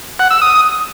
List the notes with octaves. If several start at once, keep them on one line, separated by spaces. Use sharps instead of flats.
F#5
E6
D#6